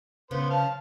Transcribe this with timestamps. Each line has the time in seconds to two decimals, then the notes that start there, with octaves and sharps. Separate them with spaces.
0.31 C#3 B3 C5
0.50 F5 A5